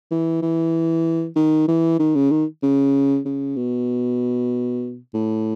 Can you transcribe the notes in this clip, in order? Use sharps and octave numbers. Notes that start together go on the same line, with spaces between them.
E3
E3
D#3
E3
D#3
C#3
D#3
C#3
C#3
B2
A2